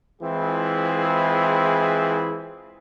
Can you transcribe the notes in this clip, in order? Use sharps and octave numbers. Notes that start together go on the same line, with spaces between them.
E3 G#3 C4 E4 F4 G#4